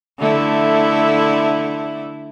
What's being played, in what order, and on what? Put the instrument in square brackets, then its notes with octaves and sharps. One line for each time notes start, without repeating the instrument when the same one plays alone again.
[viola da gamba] D3 A3 E4